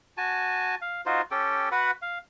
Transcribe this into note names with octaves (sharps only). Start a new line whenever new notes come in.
F#4 G#5 A5
F5
D#4 F4 F#4 C5
C#4 G4 A4 G5
F#4 B4 F#5 B5
F5